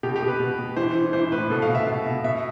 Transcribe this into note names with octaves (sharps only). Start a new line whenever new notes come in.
B2 G4
G4
B2
B4
B2
B2
E3 C5
E3
E3 C5
A2 B4
B2 A4
F5
B2
E5
B2
B2
B2 E5